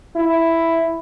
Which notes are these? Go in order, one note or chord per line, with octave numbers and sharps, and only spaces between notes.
E4